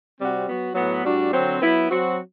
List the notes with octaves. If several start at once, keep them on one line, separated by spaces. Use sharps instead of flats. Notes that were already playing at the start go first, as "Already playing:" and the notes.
C3 G3 C4 F#4
F#3 B3 F#4
A2 F#3 B3
A2 G3 D4 F#4
D3 F#3 C4
F#3 B3 E4
F#3 C4 F#4